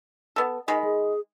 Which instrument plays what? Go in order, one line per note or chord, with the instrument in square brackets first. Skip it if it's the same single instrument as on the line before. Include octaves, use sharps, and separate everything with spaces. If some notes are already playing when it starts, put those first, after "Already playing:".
[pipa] B3 A4
[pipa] D#3 G#3 B5 [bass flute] D#5
[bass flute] G#4